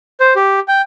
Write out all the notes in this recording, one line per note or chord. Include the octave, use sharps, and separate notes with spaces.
C5
G4
G5